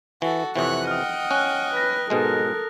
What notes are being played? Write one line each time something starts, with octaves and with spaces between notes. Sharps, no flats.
E3 F#4 A4
F2 C3 E3 C#5 F#5 F#6
D#5 G5 D#6 F6
C#4 F#6
B4 F6 A#6
G#2 B2 G#3 A4 A#4